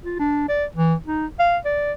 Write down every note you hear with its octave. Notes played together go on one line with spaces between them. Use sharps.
F4
D4
D5
E3
D#4
F5
D5